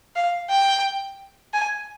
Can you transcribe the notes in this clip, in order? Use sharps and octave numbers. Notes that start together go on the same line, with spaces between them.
F5
G5
G#5